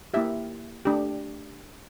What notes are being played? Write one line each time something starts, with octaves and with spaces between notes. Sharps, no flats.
A#3 E4 G4 E5
A3 D4 G4